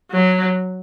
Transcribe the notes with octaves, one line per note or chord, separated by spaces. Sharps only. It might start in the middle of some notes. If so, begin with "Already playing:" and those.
F#3